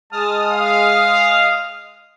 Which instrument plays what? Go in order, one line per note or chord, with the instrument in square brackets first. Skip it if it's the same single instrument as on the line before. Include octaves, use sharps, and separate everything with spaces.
[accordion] G#3 D#6 F6 [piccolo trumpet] A5
[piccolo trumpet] F5